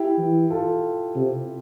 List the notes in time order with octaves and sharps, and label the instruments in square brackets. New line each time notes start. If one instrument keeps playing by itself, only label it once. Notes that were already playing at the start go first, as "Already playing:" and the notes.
Already playing: [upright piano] E4 G4
[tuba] E3
[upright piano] F4 A4
[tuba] C3